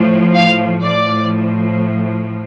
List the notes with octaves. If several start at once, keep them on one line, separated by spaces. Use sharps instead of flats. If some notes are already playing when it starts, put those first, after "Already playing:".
Already playing: A2 F3
F5
A2 F3 D5